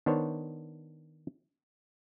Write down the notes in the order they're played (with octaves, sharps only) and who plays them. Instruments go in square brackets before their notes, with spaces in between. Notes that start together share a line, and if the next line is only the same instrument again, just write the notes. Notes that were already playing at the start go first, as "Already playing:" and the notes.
[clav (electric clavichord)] D#3 B3 D4 C5 C#5